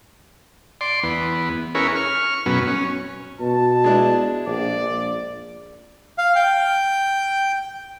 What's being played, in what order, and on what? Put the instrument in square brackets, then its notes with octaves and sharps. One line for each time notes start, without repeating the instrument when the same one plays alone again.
[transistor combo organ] D5 C6
E2 B3
C#4 E4 G#4 A#4 B4 C#5
C#6 F6
F#2 B2 F#3 B3 C#4
C#4
[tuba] B2 [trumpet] A5
[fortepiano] G#3 D4 E4
[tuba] A#1 [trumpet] D5
[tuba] A#1
[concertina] F5
G5